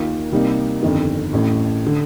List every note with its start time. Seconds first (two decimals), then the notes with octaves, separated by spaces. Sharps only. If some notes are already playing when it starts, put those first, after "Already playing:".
Already playing: D#2 D#3 A#3 F4
0.32 C2 C3 G3 A#3 D#4
0.83 G1 F2 D#3
1.33 A1 A2 A3
1.86 D3